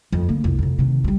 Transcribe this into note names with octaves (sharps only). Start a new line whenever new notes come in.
F2
D3 A#3
C2 F2
F2 C3
C3 D#3
F#3 G3